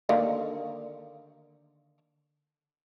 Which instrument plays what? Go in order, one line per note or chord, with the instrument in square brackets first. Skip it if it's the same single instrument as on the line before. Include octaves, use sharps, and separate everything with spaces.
[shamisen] D3 D#3 A#3